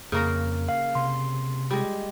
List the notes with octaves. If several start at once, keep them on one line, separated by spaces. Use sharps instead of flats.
F2 C#3 A#3 A#4
F5
C3 C6
G3 G#3